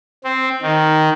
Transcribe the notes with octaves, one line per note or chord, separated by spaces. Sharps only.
C4
D#3